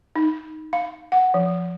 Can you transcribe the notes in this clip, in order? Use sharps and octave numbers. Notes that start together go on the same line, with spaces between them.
D#4
F5
F#5
F3